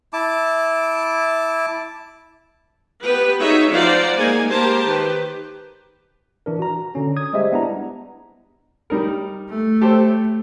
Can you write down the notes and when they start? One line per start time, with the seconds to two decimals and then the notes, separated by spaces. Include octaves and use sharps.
0.13 E4 A5 D6
3.02 B3 G4 B4
3.40 D#4 F#4 G#4 C#5 E5
3.72 F3 C5 D5 F5 F#5 A#5
4.17 G#3 A#3 D#4 G#5
4.50 A#3 G4 A#4 C5 A5
4.84 D#3 G4 B4
6.46 E3 D4 A#4
6.59 F#4 A#5
6.95 D3 C#4
7.16 D#6 G#6
7.33 G3 G#3 G4 C5 D#5 E5
7.52 B3 D4 E4 A#5
8.90 G3 D#4 A#4
9.49 A3
9.82 G4 A4 C5